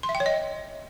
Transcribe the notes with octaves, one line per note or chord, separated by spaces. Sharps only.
C6
E5
G5
C#5
D#5